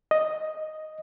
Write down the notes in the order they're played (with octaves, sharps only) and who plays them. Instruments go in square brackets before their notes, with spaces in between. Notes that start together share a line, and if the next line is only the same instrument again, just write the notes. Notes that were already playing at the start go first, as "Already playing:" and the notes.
[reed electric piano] D#5